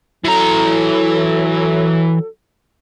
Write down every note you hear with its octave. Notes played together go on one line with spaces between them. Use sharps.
E3 F#3 A4 A#5